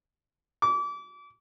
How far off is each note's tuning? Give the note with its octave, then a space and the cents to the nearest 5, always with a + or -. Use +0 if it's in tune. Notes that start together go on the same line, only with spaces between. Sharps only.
D6 -30